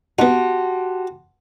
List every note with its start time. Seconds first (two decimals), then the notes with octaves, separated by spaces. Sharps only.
0.19 B3 D#4 F#4 G4 F#5 A5 C6